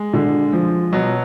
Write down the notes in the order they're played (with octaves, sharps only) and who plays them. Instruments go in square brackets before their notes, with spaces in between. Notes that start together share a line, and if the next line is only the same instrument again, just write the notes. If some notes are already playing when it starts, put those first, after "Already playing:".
Already playing: [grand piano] G#3
[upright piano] D3
F3
[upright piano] B2 [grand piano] F#3